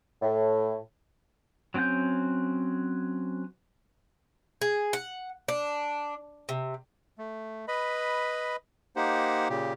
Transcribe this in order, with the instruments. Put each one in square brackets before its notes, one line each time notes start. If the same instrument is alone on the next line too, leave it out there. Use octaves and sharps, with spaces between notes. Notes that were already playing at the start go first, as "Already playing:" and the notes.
[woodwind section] A2
[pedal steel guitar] F#3 C4 C#4 F#5 G6
[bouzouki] G#4
F#5
D4
C3
[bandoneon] A3
B4 D#5 B5
A#3 D#4 G4 C5 F#5
A#2 C#3 G4